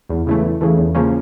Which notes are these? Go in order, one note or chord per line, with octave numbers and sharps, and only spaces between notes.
E2
C#3 E3 A3
E2
C#3 E3 A3
E2
C#3 F3 A#3 C#4